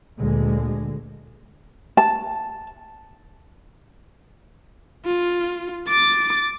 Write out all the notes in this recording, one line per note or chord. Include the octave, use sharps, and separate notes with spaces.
D2 A#2 D3 G#3
A5
F4
D6 A6